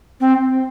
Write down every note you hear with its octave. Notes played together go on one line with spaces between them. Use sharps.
C4